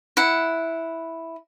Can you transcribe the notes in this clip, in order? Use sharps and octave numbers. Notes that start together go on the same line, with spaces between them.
E4 F#5